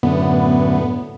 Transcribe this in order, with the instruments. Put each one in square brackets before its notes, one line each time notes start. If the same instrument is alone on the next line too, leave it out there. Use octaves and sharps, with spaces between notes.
[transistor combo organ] F#2 A2 D3 [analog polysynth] B3